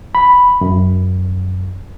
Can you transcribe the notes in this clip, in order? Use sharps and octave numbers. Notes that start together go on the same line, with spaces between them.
B5
F#2